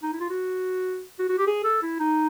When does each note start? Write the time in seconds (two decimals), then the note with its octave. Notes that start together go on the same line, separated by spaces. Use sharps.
0.03 D#4
0.12 E4
0.20 F4
0.30 F#4
1.19 F#4
1.29 F#4
1.38 G4
1.47 G#4
1.64 A4
1.82 E4
2.00 D#4